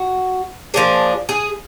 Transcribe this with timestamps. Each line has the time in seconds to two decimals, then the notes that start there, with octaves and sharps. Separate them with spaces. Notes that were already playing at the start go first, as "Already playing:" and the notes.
Already playing: F#4
0.74 F3 A#3 D4 G#4
1.29 G#4